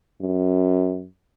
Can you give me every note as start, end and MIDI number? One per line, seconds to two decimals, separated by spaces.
0.21 1.05 42